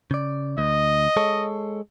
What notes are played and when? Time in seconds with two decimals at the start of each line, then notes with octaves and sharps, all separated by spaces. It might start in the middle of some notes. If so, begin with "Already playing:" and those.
0.11 C#3 D5
0.58 D2 D#5
1.17 G#3 A4 C#5